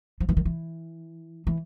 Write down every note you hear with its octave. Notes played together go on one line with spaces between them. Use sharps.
F3
E3
D#3
E3
E3